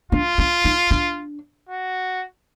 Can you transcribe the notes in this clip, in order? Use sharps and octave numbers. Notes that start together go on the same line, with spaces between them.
D4 F4
D4
D#4
D4
F#4